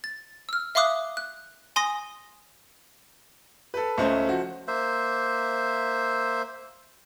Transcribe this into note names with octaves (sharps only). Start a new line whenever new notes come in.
A6
E6 F6
E5 F5 C6 D6 D#6 F#6
F#6
G#5 C6 D#6 A#6
A4 B4
C#2 A3 C#4 C5
F3 F#4
A#3 C5 E5